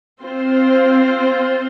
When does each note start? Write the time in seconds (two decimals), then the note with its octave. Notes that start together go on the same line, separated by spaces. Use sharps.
0.22 C4 F4 C5